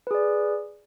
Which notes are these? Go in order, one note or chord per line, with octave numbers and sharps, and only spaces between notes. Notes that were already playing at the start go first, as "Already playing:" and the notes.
G#4 B4 D5